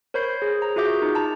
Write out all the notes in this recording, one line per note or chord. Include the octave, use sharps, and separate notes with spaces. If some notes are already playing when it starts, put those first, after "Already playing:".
A#4 C5 C#5 B5 G6 C7
G#4
A#5
F4 F#4 G#4 E5 D6 G6
D#4 A#4
A5 A#5